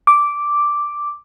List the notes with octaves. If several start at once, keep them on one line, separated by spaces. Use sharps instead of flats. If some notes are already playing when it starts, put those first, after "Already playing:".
D6